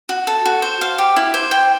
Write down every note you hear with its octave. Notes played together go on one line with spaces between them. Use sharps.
F#4
A4
F#4
C5
F5
G4
E4
C5
G5